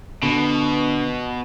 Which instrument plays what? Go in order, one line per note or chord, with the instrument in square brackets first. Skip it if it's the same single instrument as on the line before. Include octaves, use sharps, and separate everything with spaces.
[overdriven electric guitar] B2 [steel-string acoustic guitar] D3